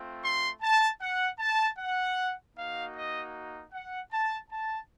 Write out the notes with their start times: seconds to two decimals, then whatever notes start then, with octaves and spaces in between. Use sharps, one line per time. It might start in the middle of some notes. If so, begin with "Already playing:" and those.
Already playing: A3 C4 F4
0.22 C6
0.61 A5
1.01 F#5
1.39 A5
1.78 F#5
2.55 A#3 D#4 F#4 F5
2.94 D#5
3.72 F#5
4.11 A5
4.50 A5